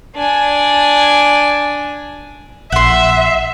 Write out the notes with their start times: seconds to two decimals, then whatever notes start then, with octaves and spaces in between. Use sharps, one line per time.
0.16 D4 G#5
2.72 A#1 E5 F#5 C6